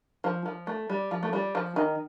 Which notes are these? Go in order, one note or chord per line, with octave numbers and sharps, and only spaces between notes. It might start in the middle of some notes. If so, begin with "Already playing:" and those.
F3
F3
A3
G3
F3
A3
G3
F3
D#3